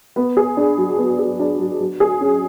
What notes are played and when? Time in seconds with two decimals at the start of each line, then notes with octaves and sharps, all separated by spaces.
0.16 B3
0.37 G#4
0.57 D4
0.77 F#3
0.98 B3
1.19 G#4
1.39 D4
1.59 F#3
1.80 F#3
2.00 G#4
2.21 C#4